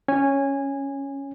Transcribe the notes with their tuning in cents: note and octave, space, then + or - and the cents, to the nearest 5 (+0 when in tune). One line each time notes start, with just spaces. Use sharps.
C#4 +0 G#5 -15